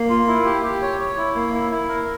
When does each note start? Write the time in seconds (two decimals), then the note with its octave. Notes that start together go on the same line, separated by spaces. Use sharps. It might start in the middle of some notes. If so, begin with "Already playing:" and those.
Already playing: A#3
0.10 F4
0.28 E4
0.45 G4
0.63 G4
0.82 C#5
1.00 C#5
1.18 E4
1.36 A#3
1.54 E4
1.71 E4
1.89 A#4